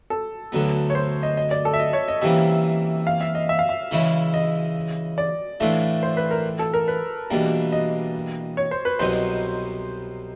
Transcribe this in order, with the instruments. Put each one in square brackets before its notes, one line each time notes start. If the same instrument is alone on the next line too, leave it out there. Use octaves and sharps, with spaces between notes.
[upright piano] A4
[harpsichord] D2 D3 F#3 B3
[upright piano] C#5
C5
D#5
D#5
D5
A4
E5
D#5
C#5
D#5
[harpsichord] C3 E3 G3 A#3 C#4 [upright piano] E5
[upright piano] F5
E5
D#5
E5
F5
E5
[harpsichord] C#3 E3 G#3 C#4 E4
[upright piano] D#5
D5
[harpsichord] A2 E3 A3 D4 F4
[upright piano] C5
B4
A#4
A4
A#4
B4
[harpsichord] E2 B2 G3 A#3 D4
[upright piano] D#5
C#5
C5
B4
[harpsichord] C2 B2 F#3 B3 D#4 [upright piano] C5